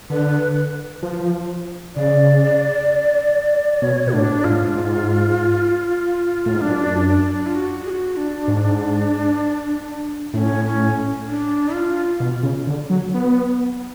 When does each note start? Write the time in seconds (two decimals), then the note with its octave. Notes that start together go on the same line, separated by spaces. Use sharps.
0.10 D3 B4
1.03 F3
1.96 C#3 D5
3.82 B2 C#5
4.07 B2
4.13 A2 D4
4.44 G#2 F4
4.75 G#2
6.46 A2
6.54 G#2
6.61 F#2 D4
7.08 D4
7.46 F4
7.55 F#4
7.86 G#4
7.90 F#4
8.17 D4
8.48 G#2
10.34 A2 C#4 D4
10.65 C#4
11.27 D4
11.74 F4
12.20 B2
12.43 C#3
12.67 D3
12.90 F#3
13.14 B3